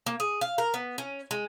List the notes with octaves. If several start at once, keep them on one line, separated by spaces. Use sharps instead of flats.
A#3
G#4
F5
A#4
B3
C#4
G#3